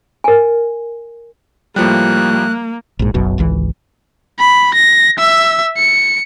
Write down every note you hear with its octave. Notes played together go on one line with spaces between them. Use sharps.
A#4 G#5
A2 F3 G3 A#3 F#6
A#1 G#2
F#1 B1 F#2 B2
G#1 C#2 E3
B5
A#6
E5 E6
C#7